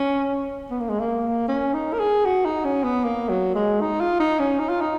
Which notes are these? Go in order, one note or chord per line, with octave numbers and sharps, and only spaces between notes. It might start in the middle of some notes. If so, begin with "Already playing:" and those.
Already playing: C#4
B3
A#3
G#3
A#3
C#4
D#4
A#4
G#4
F#4
D#4
C#4
B3
A#3
F#3
G#3
D#4
F4
D#4
C#4
D#4
F4
D#4